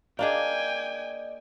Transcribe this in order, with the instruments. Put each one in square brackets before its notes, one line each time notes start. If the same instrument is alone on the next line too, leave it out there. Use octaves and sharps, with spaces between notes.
[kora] A#3 D4 G#4 [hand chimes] D5 D#5 [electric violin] G5 G#5